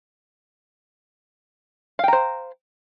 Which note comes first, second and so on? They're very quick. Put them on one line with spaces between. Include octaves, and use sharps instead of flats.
F5 G5 A#5 C5